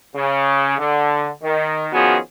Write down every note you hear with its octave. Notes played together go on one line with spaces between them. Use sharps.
C#3
D3
D#3
D#3 F3 B3 C#4 F#4 G#4